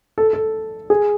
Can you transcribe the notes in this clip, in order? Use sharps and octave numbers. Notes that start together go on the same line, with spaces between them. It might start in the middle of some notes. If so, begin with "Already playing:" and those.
A4
A4
G#4